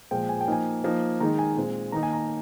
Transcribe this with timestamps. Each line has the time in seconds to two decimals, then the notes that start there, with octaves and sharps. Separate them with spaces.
0.11 A#2 F3 G#3 G5
0.29 G#5
0.41 G5
0.48 F3 A#3 D#4 G#5
0.84 F3 A#3 D#4
1.20 D#3 G#3 D#4 A#5
1.39 G#5
1.56 A#2 G#3 C4
1.92 D#3 A#3 D#4 A#5
2.03 G#5
2.13 A#5